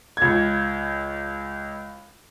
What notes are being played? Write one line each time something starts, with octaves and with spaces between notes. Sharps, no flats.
C#2 G#6